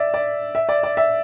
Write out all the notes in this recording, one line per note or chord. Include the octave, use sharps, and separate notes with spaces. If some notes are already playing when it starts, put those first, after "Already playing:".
Already playing: D5 E5
D5
E5
D5
D5
E5